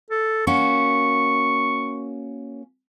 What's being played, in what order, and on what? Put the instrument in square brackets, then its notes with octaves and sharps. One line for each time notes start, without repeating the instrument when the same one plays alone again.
[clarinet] A4
[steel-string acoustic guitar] A#3 C#4 F#4 [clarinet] C#6